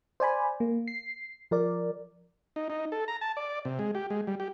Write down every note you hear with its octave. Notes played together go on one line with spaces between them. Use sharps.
C5 D5 G#5 B5
A#3
C7
F3 A#4 D5
D#4
D#4
A4
A#5
A5
D5
C3
G#3
G4
G#3
G3
G4